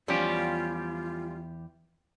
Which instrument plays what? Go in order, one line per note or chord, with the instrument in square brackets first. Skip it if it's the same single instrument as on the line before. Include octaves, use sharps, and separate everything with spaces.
[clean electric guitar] E2 G4 [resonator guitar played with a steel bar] F3 G3 C#4 [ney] F4